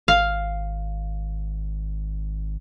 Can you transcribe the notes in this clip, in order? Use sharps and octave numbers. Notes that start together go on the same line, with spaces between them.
G#1 F5